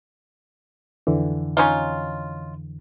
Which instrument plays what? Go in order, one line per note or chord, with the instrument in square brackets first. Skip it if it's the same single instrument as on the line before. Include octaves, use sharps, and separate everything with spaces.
[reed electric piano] F2 D3 E3
[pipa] C#4 D#4 F4